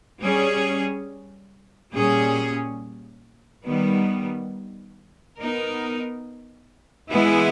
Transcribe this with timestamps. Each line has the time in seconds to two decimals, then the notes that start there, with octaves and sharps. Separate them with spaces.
0.19 G3 C#4 G#4
1.92 A#2 G3 C#4 G#4
3.65 D#3 G3 B3
5.37 B3 D#4 A#4
7.09 E3 G#3 B3 E4 G#4